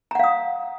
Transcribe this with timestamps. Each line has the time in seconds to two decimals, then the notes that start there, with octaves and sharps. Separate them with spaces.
0.11 A#5
0.15 F#5
0.19 F5
0.24 D#6